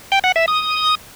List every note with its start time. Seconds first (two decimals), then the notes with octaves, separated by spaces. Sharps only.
0.12 G5
0.24 F#5
0.36 E5
0.48 D#6